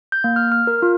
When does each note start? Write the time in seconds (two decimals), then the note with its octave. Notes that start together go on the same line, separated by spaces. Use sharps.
0.12 G6
0.24 A#3
0.36 F6
0.52 F6
0.67 A#4
0.82 F4